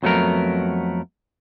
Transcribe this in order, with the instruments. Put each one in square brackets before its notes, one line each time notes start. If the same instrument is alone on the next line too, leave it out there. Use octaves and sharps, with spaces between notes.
[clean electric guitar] F2 F#3 A3 B3 A#4